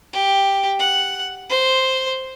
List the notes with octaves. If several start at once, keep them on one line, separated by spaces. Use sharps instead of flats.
G4
F#5
C5